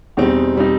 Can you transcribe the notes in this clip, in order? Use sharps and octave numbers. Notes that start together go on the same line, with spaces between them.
E2 B2 G3 C4 D#4
B2 G3 C4 D#4